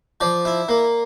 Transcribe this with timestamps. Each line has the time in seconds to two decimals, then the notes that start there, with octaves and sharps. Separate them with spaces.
0.21 F3 D5
0.45 E4
0.69 A#3